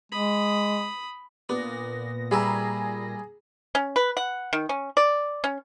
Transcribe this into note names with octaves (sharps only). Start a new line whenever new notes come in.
G#3 B5 D#6
A#2 B3 D4 A#6
G3 G#4 B4 E5 A#5
C#4
B4
F#5
D#3
C#4
D5
C#4